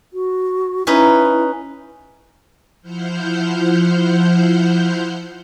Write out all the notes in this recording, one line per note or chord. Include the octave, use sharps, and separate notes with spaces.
F#4
C#4 D#4 E4 B4
F3 E4 C5 F#5 F6 G6